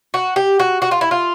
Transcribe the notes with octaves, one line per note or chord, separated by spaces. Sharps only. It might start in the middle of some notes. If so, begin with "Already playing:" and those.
F#4
G4
F#4
F#4
F4
E4
F4